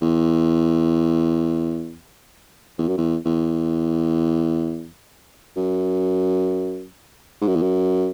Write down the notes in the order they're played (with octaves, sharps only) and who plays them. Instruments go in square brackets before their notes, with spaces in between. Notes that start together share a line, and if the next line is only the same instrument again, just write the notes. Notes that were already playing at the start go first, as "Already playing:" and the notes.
[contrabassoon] E2
E2
F#2
E2
E2
F#2
G#2
F#2
E2
F#2